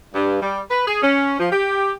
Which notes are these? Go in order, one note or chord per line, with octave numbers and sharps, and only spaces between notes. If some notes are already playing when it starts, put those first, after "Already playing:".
G2
G3
B4
G#4
C#4
F3
G4